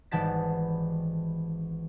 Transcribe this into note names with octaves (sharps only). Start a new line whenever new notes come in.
G#1 E3 G3 B3 A5 B6